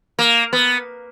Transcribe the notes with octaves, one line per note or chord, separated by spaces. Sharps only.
A#3
B3